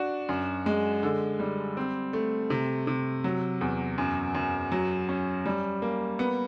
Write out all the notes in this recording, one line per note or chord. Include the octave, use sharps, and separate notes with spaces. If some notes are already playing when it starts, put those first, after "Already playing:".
Already playing: D4 F#4
F#2
G#3
D3
G3
C4
A3
C3
C3
F#3
E2
F#2
F#2
F#3
C#4
G3
A#3
B3